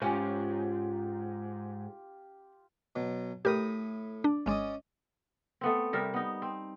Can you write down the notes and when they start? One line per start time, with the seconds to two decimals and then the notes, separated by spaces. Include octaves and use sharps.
0.02 G#2 C#4 F4 G4
2.96 B2 F#3
3.45 A2 G4 A#4 B5 D#6
4.24 D4
4.46 G#1 G#3 C#4 D5 D#5
5.61 A3 B3 C4
5.93 C3 G3 A#4 E5
6.14 B3 D#4
6.42 C4